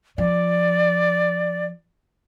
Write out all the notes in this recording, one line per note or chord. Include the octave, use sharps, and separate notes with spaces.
F3 D5